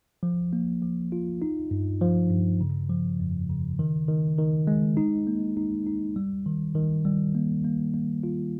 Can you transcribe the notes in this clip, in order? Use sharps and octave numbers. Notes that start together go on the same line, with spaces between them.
F3
A#3
F3
F4
D#4
G2
F3
G2
C#3
F3
F2
C#3
D#3
D#3
D#3
G#3
D#4
A#3
D#4
D#4
G3
D#3
D#3
G3
A#3
A#3
A#3
F4